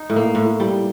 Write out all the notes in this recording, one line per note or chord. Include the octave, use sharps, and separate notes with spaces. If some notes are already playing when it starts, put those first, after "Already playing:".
Already playing: D#4
A2
A#3
A2
G3